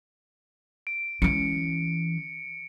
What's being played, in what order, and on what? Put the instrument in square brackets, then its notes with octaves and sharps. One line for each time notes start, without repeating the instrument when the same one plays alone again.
[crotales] D7
[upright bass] E3 C#4 [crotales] C#7 D7